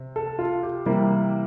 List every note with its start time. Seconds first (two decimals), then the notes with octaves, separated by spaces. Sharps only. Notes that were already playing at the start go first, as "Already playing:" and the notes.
Already playing: C3
0.16 A4
0.39 F4
0.63 G4
0.86 C3 E3 G3 A#3